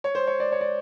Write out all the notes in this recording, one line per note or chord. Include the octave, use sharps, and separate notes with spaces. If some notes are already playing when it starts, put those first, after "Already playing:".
C#5
C5
C#5
D5
C#5
D5